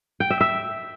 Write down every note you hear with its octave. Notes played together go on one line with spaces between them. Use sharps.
G5
E5
E5